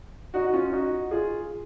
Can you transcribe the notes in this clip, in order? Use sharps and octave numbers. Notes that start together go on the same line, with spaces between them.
D#4 F#4
F#4
C#4 F4
D#4 F#4
F4 G#4